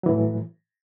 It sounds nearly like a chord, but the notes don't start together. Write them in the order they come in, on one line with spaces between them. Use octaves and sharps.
F#3 E3 A2